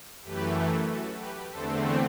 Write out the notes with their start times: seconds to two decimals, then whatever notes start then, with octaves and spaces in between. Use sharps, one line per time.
0.23 F#2 E3 A3 G4 B4
0.88 F#4 A4
1.20 G4 B4
1.52 E2 D3 A3 C4 A4 C5